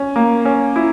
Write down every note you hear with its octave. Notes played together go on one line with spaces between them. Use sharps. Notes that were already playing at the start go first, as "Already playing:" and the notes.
Already playing: C#4
A#3
C#4
E4